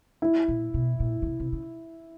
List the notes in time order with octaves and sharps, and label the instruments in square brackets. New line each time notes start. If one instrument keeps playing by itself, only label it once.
[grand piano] E4
[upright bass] A#2
B2
A#2
C#3
C3
C3
C#3